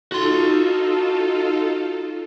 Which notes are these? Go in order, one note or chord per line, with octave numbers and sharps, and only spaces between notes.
D#4 F4 F#4 A4 C6